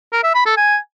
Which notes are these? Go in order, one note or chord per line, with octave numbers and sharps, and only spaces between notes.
A#4
E5
B5
A4
G#5